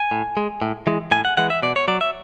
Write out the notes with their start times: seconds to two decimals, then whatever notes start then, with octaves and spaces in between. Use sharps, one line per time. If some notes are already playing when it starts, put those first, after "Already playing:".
Already playing: G#5
0.11 A2
0.37 G#3
0.62 A2
0.87 E3 G#3
1.11 A2 G#5
1.25 F#5
1.37 E3 G#3 F#5
1.50 E5
1.63 B2 D5
1.76 C#5
1.88 F#3 D5
2.01 E5